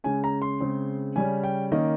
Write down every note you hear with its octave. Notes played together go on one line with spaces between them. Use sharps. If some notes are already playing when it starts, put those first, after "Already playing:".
C#3 G#3 C#4 G#5
A#5
C6
C#3 G#3 C4
C#3 G3 C#4 G#5
G5
D#3 A#3 C#4 D#5